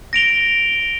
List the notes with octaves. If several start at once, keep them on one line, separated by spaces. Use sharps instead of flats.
A#6 D7 F7 G7